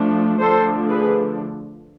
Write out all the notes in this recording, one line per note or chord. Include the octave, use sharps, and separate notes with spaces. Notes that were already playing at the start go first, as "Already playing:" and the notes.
Already playing: F3 A3 D4
D3 F3 A3 D4 A4 C5
G#4 B4